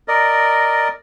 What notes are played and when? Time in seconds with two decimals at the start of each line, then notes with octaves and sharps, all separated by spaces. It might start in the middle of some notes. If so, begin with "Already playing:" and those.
0.08 A#4 D5 D#5